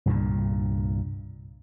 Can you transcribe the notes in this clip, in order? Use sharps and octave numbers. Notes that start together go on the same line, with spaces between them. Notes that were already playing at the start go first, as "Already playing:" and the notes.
C2 G2 A#2 D3